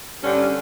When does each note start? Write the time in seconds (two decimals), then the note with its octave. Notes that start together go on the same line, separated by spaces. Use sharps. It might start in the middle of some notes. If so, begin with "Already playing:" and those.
0.23 G2 D3 G3 C#4
0.37 C#4